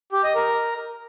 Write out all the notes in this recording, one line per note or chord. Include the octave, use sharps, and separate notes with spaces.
G4
D#5
A#4